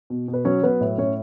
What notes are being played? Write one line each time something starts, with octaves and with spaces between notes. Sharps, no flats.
B2
B2
B4
F#3 C#4 C#5
F#3 B3 B4
A2
A2 C#4 C#5